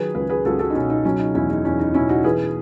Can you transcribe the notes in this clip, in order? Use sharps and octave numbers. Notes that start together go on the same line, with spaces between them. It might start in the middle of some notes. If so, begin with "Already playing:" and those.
Already playing: D#3 F#3 G#4 B4
C#2 B4
G#4 B4
C#2 F#4 A4
F#4 A4
D#4
B2 C#4
D#4
F#3 C#4
D#4
E2 C#4 E4
D#4
E2 C#4
D#4
B2 C#4 E4
D#4 F#4
E3 G#4 B4